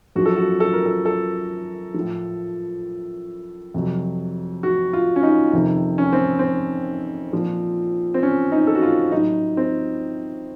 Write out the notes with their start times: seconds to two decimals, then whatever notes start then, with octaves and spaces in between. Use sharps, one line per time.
0.15 F#2 F3 F#4
0.25 A4
0.37 F#4
0.60 A4
0.73 A#4
0.86 A4
1.05 A4
1.94 A2 F3
3.74 F2 C3 F#3
4.63 F#4
4.93 F4
5.16 C#4
5.23 D#4
5.53 F2 C3 D#3
5.98 C#4
6.13 C4
6.39 C4
7.32 A#2 F3
8.14 C4
8.23 C#4
8.52 D#4
8.67 A4
8.75 F#4
8.82 F4
9.11 A2 F#3 D#4
9.57 C4